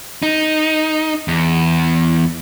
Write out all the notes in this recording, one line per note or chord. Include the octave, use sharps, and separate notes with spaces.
D#4
E2